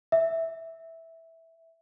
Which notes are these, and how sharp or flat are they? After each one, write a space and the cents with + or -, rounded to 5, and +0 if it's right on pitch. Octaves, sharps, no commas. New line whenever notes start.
E5 -10